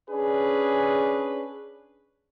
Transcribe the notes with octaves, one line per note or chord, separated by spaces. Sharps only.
C#4 D4 G#4 B4